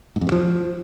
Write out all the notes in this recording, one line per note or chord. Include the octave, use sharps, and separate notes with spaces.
G#2
F2
G2
F3